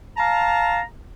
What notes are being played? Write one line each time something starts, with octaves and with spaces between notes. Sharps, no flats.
F5 A5 A#5